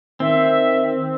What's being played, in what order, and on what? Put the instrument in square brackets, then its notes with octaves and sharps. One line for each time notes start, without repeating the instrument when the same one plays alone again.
[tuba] D#3 [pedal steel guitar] C4 [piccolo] E5